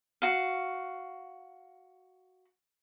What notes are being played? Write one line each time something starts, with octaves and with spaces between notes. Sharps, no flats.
F#4 F5